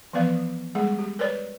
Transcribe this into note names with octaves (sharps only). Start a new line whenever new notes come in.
E3 F3 B3 B4 D5 F5
G3 G#3 G#4 F#5
G4
A#4 B4 C#5 D5